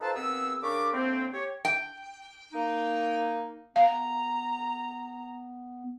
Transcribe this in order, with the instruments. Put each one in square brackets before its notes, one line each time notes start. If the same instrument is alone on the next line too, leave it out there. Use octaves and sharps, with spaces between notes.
[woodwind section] D#4 F4 A4 B4 C5 A5
D#2 B3 C4 G#4 E6
C#3 D4 A#4 B5 C#6 D6
A2 D3 A#3 C4
G4 C#5
[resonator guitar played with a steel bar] G5
[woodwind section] A#3 D#4
[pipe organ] B3 [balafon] F5 [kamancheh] A#5